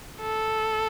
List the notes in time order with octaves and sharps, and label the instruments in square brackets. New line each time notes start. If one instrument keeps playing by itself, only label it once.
[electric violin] A4